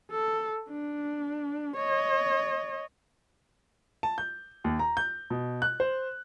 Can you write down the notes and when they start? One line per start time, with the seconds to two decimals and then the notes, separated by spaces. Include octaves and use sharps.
0.11 A4
0.70 D4
1.77 C#5 D#5
4.03 A5
4.18 G6
4.64 D#2
4.79 A#5
4.97 G6
5.30 B2
5.62 F#6
5.80 C5